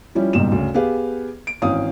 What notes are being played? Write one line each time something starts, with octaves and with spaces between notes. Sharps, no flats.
F3 G3 C#4 E4
F#1 B1 G#2 G3 E7
D2 C#3
B3 G4 G#4 B4 F5
D7
G#1 E3 C#4 F5 D#6